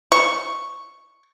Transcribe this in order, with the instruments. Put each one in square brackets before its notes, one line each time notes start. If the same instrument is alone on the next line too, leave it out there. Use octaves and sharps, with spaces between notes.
[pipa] C#6